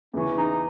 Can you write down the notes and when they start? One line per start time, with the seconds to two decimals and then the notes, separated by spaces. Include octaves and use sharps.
0.13 E2 C#3 E3 C#4
0.38 D#4